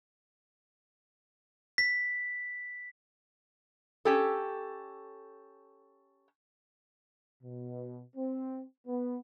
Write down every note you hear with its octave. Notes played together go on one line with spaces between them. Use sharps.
B6
C#4 G4 A4
B2
C4
B3